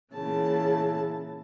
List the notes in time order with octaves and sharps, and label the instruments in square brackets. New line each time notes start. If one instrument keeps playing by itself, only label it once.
[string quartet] A#2 C#3 E3 A5